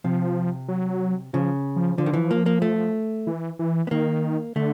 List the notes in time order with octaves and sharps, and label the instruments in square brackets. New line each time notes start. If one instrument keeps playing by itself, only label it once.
[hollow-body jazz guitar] C3 [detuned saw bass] F3
[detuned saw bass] F#3
[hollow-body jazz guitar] C#3 [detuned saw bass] F3
[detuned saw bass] F3
[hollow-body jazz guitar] D3 [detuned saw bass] F3
[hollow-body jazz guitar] D#3
E3
A#3
A#3
A3
[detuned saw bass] E3
E3
[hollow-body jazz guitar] B3
[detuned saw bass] D#3 [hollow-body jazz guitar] A#3
[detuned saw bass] D3 [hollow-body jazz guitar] A3